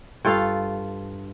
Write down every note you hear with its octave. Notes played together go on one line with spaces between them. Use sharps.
G2 F4 A4 F5